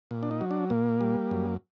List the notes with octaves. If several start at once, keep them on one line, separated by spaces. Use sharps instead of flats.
A#2
D4
D#4
F#3
D4
A#2 A#3
G3
F#2